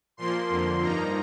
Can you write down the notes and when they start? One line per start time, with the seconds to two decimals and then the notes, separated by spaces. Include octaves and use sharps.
0.17 A#2 F3 A#3 C6
0.49 F2 D3 F3 A#3
0.81 G2 F3 A#3 D#4 A#5